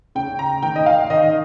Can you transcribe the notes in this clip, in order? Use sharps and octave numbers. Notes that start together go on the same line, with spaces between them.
C#3 G5
A#5
D#3 G5
D#5
F5
D#3 D#5